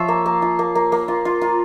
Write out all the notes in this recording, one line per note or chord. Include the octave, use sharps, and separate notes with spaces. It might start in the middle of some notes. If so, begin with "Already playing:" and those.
Already playing: F3 F4 C#5 E5
A#3
A#3
F4
A#3
A#3
A#3
F4
F4
F4